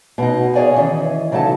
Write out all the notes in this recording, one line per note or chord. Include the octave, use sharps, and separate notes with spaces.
B2 D#4
G#4 C#5 D5 F5 G#5
D#3 E3 C#4
C#3 F#3 D#4 A4 A5